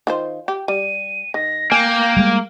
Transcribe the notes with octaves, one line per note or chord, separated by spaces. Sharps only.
D#3 F4 C5
G4
G3 D#7
D#3 A#6
A#3 G5 G#5
G3 G#3